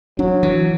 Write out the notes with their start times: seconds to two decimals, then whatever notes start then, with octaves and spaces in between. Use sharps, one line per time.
0.18 F#3 D4
0.43 E3